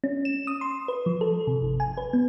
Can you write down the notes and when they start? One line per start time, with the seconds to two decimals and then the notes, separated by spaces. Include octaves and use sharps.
0.04 C#4
0.25 E7
0.47 D#6
0.61 C6
0.88 B4
1.06 F3
1.21 A4
1.47 C3
1.62 G1
1.80 G#5
1.97 B4
2.13 B3